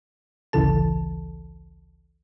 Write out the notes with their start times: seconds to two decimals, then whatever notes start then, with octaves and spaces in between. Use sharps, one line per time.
0.53 A1 D2 C#3 E3 A4 A5